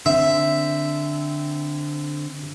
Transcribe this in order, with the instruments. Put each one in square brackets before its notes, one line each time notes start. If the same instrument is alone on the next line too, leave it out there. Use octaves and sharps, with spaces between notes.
[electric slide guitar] D3 C4 [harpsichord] E5